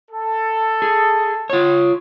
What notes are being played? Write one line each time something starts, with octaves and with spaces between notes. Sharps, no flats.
A4
G#4
F4 C#5